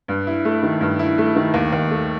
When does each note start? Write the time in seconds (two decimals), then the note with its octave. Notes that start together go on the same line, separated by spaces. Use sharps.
0.08 G2
0.27 E4
0.45 A3
0.63 D#3
0.81 G2
0.99 E4
1.18 A3
1.36 D#3
1.54 D#2
1.72 D#2
1.91 A3